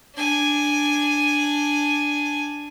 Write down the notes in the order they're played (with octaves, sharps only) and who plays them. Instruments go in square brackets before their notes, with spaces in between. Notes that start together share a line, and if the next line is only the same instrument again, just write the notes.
[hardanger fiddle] D4 G#5